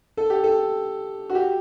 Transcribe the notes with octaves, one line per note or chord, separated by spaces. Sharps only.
A4
G4
A4
F#4
G4